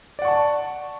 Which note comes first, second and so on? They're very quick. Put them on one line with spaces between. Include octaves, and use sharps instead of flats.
D5 F#5 C#6 A5